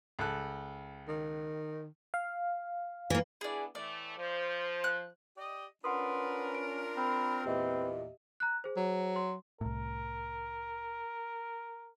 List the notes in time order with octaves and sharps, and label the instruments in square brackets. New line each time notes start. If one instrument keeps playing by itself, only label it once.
[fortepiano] C#2 A4 F#6
[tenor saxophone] D#3
[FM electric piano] F5
[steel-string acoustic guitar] E3 A#3
[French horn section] B3 D4 E4 [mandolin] G#4 D5
[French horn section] A2 E3 A3 [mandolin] D5
[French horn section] F3 [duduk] C5
[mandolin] F#6
[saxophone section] G4 D5 D#5
[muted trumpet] C#4 [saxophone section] D4 F4 A#4 [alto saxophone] B4 [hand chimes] F#5 C6 D#6
[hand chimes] D7
[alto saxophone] C4 [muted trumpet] B5
[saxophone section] E2 A#2 [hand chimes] G4 D#5 E5 [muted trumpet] B4
[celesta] A#5 F#6
G#4 C5
[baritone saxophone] F#3
[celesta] C6
[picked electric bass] C2 A2 [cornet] A#4